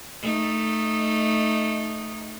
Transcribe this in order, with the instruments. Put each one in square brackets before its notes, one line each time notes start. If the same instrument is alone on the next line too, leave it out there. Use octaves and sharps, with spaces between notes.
[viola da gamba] A3 D#4